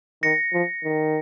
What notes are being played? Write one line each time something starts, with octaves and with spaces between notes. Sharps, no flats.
D#3 A#6 C#7
F3
D#3